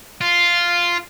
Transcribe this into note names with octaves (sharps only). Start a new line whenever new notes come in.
F4